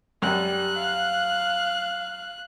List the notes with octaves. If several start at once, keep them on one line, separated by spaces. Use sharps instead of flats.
F#2 G3 F#6
F5